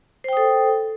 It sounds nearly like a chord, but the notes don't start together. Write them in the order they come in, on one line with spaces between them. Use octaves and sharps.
C5 G5 D#6 A4